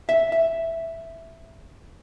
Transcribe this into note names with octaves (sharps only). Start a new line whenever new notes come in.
E5
E5